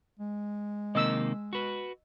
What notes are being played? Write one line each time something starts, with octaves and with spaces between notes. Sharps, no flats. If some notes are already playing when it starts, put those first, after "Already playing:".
G#3
C3 D#3 A#3 D#5 E6
F#4 B4